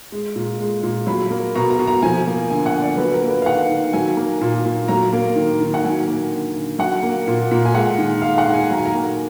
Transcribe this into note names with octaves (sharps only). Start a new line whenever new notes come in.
G#3
A#2
G#3
A#2
F#3 B5
A#3
B2 A#5
A#5
B2
A#5
F3 G#5
A#3
D3 G#5
F#5
D3
D5
F#3 B4
A#4
A#3
B4
F5
D#3 F#5
D#3
F#3 G#5
A#3
A#2
A#2
F#3 A#5
A#3
D#3
D#3
F#5
F#3 G#5
A#3
D3
D3
F#3 F#5
A#3
A#2
A#2
G#5
G#3 F#5
D#3
G#3 F5
F#5
D#3
G#5
F#3 A#5
G#5
A#5
A#3